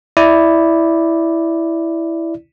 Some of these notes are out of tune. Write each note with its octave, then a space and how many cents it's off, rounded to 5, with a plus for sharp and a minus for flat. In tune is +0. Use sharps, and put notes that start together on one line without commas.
E4 +0 D5 +0